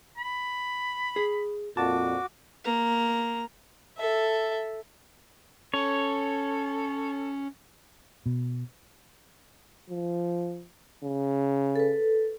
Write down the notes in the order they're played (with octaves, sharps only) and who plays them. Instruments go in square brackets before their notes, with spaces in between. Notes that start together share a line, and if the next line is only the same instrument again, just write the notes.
[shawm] B5
[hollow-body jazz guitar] G#4
[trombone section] F2 A#2 [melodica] F#4 D6 [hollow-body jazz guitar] A5
[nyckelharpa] A#3 A#5
[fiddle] A4 E5
[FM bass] C#4 [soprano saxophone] A4 [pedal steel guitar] C#5
[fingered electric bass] B2
[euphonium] F3
C#3
[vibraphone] A4 B4